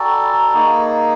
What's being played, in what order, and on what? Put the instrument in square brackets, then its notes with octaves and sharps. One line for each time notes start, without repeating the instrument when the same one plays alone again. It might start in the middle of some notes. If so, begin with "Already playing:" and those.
Already playing: [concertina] F#4 A4 D5 [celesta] G5 G#5 A#5
[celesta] B5
A#5
[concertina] A#3 D#4 G#4 [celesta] A#5